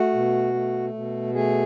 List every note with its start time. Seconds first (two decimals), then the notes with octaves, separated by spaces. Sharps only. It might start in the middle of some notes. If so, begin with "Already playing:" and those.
Already playing: A3 F#4
0.13 B2
0.54 A3
0.94 B2
1.34 A3 G#4